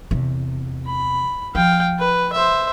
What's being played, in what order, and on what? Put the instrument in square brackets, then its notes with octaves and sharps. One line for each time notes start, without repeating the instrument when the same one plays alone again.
[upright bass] E2 C3
[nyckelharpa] B5
[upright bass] F3 [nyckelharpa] F5 G5
[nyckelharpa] B4
C5 E5